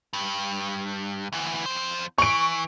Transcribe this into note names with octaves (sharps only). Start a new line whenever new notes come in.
G2
D2 E3
F2 C5
E3 C#6 D7